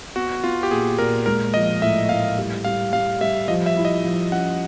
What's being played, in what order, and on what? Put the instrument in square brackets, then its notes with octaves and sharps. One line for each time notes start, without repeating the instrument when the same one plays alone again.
[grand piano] B3 [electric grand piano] F#4
[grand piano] B3 [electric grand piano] F4
[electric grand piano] G4
[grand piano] A#2 [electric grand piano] G#4
[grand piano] A#2 [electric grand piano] A#4
[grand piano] G#3 [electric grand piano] A#4
[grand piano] F3 [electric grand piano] D#5
[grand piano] A2 [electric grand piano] E5
[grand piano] A2 [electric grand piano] F5
[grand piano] G3
[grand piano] G3 [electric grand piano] F5
[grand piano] G3 [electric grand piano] F5
[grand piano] G3 [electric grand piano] E5
[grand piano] F3 [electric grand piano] D#5
[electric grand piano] E5
[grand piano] E4
[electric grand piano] D#5
[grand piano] F3
[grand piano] C#4 [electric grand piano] F#5